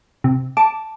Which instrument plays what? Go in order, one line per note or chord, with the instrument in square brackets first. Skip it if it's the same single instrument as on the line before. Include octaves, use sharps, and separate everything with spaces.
[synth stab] C3
[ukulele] A5 [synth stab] D6